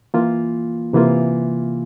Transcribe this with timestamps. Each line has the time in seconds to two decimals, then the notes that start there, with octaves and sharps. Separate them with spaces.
0.14 E3 A#3 F4
0.93 C3 E3 A#3 F4